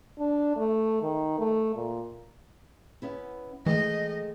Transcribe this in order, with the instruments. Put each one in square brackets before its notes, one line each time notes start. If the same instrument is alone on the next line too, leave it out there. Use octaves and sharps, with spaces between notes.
[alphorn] D4
A3
D#3
A3
A#2
[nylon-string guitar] B3 C#4 E4
[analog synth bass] E3 [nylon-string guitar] G#3 A3 G5 [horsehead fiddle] D#5